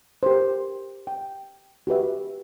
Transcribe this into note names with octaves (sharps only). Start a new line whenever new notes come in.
G4 A#4 C5
G5
F#4 G4 B4 E5